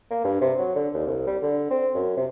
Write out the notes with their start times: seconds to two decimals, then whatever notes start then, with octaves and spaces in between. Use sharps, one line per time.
0.10 A#3
0.24 G2
0.41 C3
0.58 F#3
0.75 D3
0.94 D#2
1.07 C2
1.27 G3
1.42 D3
1.70 C4
1.94 F#2
2.17 C3